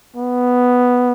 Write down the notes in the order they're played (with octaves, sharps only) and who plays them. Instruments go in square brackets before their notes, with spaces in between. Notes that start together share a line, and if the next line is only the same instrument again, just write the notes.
[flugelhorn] B3